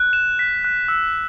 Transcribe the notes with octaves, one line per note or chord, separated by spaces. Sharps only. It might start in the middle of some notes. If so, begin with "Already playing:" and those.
Already playing: F#6
E7
B6
F#6
E6